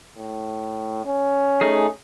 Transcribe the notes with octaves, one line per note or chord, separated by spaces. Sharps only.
A2
C#4
A3 D#4 G#4